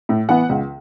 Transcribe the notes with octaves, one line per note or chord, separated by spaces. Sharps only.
A2
E3 B3 F#5
C#2